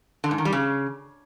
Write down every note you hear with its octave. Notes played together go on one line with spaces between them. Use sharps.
D3
G#2
D#3
G3
C#3